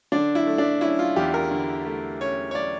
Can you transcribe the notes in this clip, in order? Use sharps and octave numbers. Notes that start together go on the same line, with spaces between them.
D3 D4
E4
A3
D4
C#4 E4
F4
E2 G4
A#4
D3
A3
C#4 C#5
C#5
D5